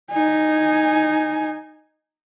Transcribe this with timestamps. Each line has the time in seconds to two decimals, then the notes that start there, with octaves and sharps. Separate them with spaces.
0.11 D#4 G#5